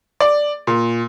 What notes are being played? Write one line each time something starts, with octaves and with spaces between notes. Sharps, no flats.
D5
A#2